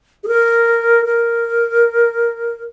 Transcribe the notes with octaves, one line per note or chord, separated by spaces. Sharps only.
G#4
A#4
A#4